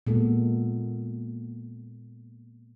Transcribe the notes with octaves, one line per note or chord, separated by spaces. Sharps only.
A#2 G#3 A#3 B3 A4